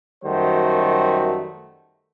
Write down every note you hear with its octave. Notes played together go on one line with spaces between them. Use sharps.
F#2 D#3 G3 A3 F#4 C5